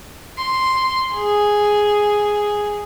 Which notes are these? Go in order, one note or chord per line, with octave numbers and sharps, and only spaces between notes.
C6
G#4